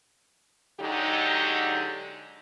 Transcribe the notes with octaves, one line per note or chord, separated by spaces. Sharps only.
D3 F#3 G#3 D#4 G4